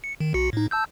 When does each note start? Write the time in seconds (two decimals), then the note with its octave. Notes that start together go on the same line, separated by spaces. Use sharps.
0.04 C#7
0.20 D#3
0.34 B1 F#4 C#7
0.53 A2 D#4
0.71 A5 E6 G6